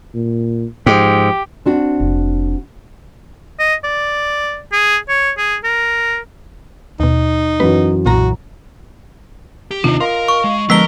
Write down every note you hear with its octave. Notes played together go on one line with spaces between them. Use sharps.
A#2
G#2 F3 G4
C4 D4 F#4
F1
D#5
D5
G#4
C#5
G#4
A#4
D#2 B2 D#4
F#2 E3 F#3 B4
B1 A#2 F#4 A#5
G4
D#2 C3 D4 D#4 F4
A#4 D#5 F5 C6
C#6
G#3
D3 F3 G#3 B3 A#4 A#5 B6 G7